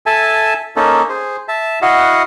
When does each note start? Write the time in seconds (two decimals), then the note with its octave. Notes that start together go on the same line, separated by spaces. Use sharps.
0.06 A4 E5 G#5 A5
0.76 A#3 C#4 D#4 A4
1.09 G#4 C5
1.48 E5 A5
1.82 E4 F#4 D#5 F5 F#5